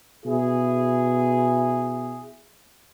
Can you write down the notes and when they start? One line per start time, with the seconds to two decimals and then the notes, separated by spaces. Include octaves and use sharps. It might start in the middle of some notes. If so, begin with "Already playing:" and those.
0.25 B2 E4 G#4